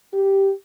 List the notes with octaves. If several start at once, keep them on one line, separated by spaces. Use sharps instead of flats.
G4